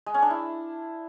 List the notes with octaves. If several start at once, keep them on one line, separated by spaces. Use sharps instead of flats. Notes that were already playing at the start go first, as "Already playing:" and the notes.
G#3
C#4
D4
E4